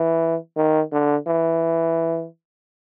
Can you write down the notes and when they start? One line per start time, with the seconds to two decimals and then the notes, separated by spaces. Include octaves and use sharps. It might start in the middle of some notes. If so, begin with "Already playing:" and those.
Already playing: E3
0.56 D#3
0.92 D3
1.27 E3